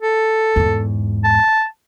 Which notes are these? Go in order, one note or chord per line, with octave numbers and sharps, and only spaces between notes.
A4
E2 G#2
A5